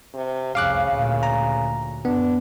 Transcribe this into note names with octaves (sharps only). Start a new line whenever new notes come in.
C3
F1 C2 C#3 F5 D6 F#6
D2 A#2
A#5
F#2 B3 D4